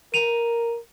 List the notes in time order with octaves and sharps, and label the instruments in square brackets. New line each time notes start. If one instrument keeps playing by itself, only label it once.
[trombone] A#4 [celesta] D#7 F7